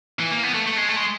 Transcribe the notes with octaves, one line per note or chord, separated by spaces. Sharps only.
E3
A#3
B3
A3
A3
G#3
A3
G#3